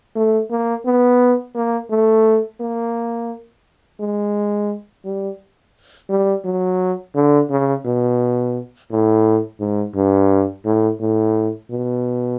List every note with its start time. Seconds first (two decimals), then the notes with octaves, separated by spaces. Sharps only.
0.16 A3
0.50 A#3
0.86 B3
1.55 A#3
1.90 A3
2.60 A#3
4.00 G#3
5.05 G3
6.10 G3
6.45 F#3
7.15 D3
7.50 C#3
7.85 B2
8.90 A2
9.60 G#2
9.96 G2
10.65 A2
11.00 A2
11.70 B2